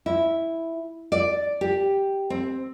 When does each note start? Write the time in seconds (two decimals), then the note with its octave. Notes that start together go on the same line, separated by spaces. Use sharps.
0.06 E4
1.12 D5
1.61 G4
2.30 C4